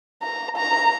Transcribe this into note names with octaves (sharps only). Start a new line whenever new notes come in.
A#5
A#5